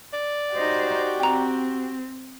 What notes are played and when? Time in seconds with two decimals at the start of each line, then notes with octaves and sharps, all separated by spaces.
0.13 D5
0.55 D#4 F#4 G4 C5
1.20 C4 G5 A#5